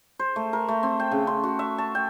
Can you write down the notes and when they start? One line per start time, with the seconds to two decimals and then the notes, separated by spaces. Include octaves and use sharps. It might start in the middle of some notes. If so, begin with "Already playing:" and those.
0.19 C5
0.36 A3
0.53 A#4
0.68 A3
0.83 C4
1.00 G5
1.11 C#3
1.27 C6
1.44 F#4
1.59 E5
1.78 A5
1.95 G5